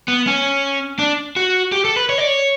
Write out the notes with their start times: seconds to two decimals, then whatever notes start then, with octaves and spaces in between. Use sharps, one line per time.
0.08 B3
0.27 C#4
0.99 D4
1.36 F#4
1.72 G4
1.85 A4
1.96 B4
2.09 C#5
2.18 D5
2.28 C#5